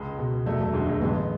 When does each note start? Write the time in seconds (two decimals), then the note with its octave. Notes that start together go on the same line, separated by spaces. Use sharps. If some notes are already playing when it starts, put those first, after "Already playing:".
Already playing: C#2 G#3
0.18 B2
0.46 E1 F#3 A3
0.60 F#3 A3
0.73 D2 D3 G#3
0.87 F#3 A3
1.01 A1 G#3 B3